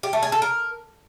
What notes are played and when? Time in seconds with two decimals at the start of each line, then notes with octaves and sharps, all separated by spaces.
0.03 G4
0.13 A3
0.23 G#4
0.32 A4
0.42 A#4